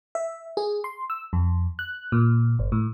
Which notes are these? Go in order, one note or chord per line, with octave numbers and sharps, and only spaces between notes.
E5
G#4
C6
E6
F2
F#6
A#2
G1
A2